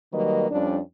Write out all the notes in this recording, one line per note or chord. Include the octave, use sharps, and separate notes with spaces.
D#3 F#3 G3 A#3 B4 D#5
F2 G3 C#4 D4